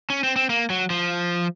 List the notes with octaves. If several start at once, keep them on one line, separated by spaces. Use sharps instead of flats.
C#4
C4
C4
A#3
F#3
F3